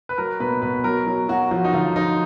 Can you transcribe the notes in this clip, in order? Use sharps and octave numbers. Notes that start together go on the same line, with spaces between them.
B4
F#3 A#4
B2 B4
B2 B4
F#3 A#4
F#3
F#3 F#4
F3 F#4
D#4
D3 F4
F3 D#4